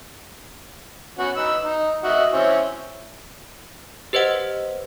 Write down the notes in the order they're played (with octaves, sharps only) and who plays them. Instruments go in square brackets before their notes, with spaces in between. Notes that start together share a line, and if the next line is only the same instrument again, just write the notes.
[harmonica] B3 C#4 F#4
D#4 B4 E6
D#4
F#4 D#5 E5
C4 C#4 E4
[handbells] G4 B4 C5 D#5 F#5